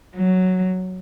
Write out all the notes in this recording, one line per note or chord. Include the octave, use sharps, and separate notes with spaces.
F#3